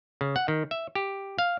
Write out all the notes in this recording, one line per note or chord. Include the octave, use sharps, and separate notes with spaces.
C#3
F#5
D#3
E5
G4
F5